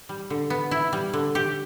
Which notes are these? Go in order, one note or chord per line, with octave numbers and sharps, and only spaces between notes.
G3
D3
B3
E4
G3
D3
G4